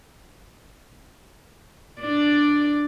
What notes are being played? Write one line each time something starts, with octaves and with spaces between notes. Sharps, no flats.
D4 D5